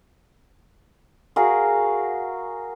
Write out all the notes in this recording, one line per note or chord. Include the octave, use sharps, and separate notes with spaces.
F#4 G#4 A#4 F5